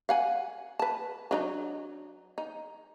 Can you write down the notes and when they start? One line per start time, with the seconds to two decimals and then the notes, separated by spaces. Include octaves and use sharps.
0.09 F5 F#5 G#5
0.79 B4 A5
1.31 F#3 D4 D#4
2.38 D#4